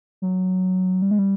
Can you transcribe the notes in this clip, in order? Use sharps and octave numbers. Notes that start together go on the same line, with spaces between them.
F#3
G3
G#3
G3